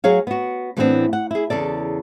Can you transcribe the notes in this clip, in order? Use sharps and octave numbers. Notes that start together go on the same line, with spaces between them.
F#3 G#4 C#5 F5
B3 F#4
A2 E3 A3 B3 C4 D4
F#5
E4 G#4
E2 C#3 A4 D5